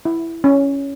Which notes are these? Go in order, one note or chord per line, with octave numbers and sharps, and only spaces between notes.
E4
C#4